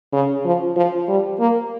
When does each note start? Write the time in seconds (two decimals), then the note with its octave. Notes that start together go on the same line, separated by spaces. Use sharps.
0.13 C#3
0.45 F3
0.76 F3
1.08 G3
1.40 A#3